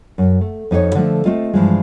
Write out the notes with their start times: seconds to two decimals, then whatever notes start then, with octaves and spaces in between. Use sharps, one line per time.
0.18 F#2
0.41 A3
0.71 F2 D#4 F#4 C#5
0.95 D3 F3 A3
1.25 A3 C4 F4 D#5
1.54 G2 E3 F3 G#3